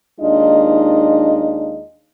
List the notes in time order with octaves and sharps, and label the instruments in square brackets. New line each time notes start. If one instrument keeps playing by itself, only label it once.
[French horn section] D#2 G#3 D4 D#4 F4 D#5